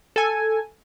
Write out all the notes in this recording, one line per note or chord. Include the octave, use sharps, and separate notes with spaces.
A4 G#5